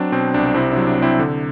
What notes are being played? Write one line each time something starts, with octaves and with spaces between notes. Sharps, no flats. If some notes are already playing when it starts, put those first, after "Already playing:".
Already playing: F#3 C4 D4
B2 C4
C2 D4
C3 C4 E4
D4
F#3
D4
C3 C4 E4
D3